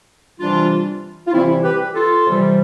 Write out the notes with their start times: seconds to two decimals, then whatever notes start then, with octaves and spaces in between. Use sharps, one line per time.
0.40 C3 E3 G3 D4 F4
1.27 F4
1.33 C3 E3 G3 C4 E4
1.63 G4 B4
1.94 F4 A4
2.26 C3 E3 G3